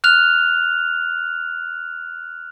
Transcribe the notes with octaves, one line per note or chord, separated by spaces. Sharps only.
F6 F#6 F7